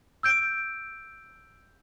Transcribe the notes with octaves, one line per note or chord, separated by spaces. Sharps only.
E6 G6 D7